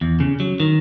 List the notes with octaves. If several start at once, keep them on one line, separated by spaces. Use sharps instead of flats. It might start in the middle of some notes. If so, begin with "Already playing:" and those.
E2
C#3
F#3
D#3